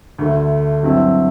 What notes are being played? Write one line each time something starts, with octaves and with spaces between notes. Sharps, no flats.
D2 D3 A3
G2 F#3 C4 E4